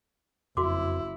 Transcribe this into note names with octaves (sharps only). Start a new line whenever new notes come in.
F#1 F2 E4 F#4 C6 D6